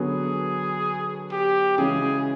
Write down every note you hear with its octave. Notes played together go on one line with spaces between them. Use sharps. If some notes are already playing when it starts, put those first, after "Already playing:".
Already playing: D3 F#3 B3 G#4
G4
C#3 E3 G#3 C#4 F#4 G#4